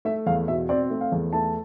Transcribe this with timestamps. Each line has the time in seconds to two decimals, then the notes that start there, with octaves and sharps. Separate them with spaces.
0.05 A3 E5
0.26 E2 F5
0.48 B2 E5
0.69 C4 D5
0.90 A3
1.01 F5
1.12 E2
1.33 A3 A5